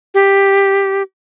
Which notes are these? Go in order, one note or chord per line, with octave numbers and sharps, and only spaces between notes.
G4